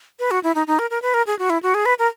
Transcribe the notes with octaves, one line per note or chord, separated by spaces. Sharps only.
B4
F#4
E4
D#4
D#4
A#4
A#4
B4
A#4
G#4
F#4
E4
F#4
G#4
B4
A#4